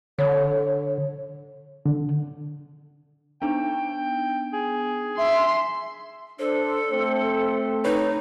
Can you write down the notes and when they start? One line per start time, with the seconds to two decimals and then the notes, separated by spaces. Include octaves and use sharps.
0.19 D3 C#5
1.86 D3
3.42 B3 D4 D#4 G5
4.53 G#4
5.18 E5 C6
6.39 D4 A4 C5
6.91 A3 C4 C5
7.85 D#4 B4 C#5